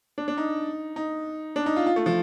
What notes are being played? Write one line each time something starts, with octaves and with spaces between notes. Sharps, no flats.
D4
D4
D#4
D#4
D4
D#4
F4
F4
A3
F3